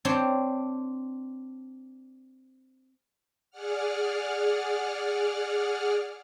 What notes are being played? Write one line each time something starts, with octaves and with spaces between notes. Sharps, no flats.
C4 D4 C5 C#5
G#4 D5 F#5 F6